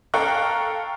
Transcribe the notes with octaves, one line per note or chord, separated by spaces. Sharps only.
A4 F5 G5 A#5 C#6 F#6